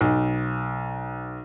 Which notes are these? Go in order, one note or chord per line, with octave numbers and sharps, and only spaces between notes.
B1